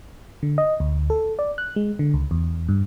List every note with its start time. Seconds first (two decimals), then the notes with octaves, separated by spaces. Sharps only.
0.43 D3
0.58 D#5
0.80 D2
1.10 A4
1.39 D5
1.58 F#6
1.76 G#3
1.99 D3
2.14 C#2
2.31 E2
2.69 G2